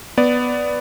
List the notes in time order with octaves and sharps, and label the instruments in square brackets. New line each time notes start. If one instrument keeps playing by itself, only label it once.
[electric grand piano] B3 D5